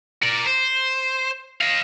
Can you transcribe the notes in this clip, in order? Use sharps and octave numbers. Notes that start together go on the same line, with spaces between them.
A#4 D5
C5
D#5 F5